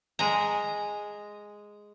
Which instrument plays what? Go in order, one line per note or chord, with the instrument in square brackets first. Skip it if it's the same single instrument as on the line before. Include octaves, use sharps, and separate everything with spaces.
[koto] G#3 A#5